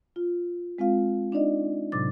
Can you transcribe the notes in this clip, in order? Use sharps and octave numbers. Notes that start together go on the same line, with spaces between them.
F4
G#3 C4 F4 F5
D4 D#4 D5 D#5
A2 C3 F#3 D6 A6